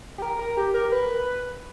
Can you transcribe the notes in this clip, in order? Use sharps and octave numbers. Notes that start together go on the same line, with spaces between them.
G4
A#4
A#4
G4
A#4
B4